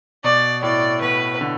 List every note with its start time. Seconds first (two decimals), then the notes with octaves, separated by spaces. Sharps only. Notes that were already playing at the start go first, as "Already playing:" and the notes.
0.24 B2 D5
0.63 A2 D5
1.01 B2 B4
1.41 D3